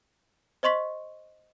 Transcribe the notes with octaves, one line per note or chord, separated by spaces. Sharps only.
C5 D#5 C6 C#6 B6